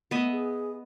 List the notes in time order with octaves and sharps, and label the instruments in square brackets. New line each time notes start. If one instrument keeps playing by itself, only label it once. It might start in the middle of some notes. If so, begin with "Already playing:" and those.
[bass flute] A3 [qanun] B3 D#5 E5
[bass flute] G#4